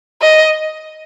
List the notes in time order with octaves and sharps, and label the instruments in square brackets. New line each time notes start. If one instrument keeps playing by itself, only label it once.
[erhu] D#5